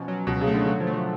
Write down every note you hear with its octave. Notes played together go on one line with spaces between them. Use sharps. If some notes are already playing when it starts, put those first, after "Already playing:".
Already playing: B2 F3 C#4
F#3
C#2 B2
C#3
A3
D3
D3 F#3
F3
A3
F3